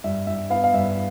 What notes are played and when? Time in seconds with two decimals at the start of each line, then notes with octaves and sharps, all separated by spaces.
0.04 G2 E5
0.27 G2 E5
0.50 B3 F5
0.64 F5
0.74 G2 E5